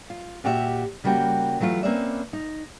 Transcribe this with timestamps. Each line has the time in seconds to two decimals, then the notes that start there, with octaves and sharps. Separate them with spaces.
0.10 F4
0.44 A#2 F#4 G4 A4 E5
1.04 C#3 G3 A#3 F#4 G5
1.60 E3 F#3 A3 C#4 F4
1.83 A#3 C4 C#4 B4 D5 E5
2.33 D#4